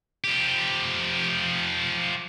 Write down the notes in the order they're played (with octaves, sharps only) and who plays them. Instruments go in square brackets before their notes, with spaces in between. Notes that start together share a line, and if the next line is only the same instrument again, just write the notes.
[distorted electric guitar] F3 G4